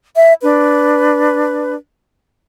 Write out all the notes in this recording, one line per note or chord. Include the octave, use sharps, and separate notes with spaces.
E5
D4 B4